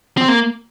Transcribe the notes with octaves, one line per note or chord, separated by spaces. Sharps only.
C4
A#3